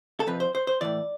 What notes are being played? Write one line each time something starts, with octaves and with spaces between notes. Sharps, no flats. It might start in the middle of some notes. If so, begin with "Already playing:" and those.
A4
F2 C3 F3 B4
C5
C5
C5
A2 E3 D5